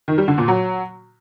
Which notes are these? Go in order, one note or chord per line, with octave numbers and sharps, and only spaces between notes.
D#3
G3
D3
A#2
F#3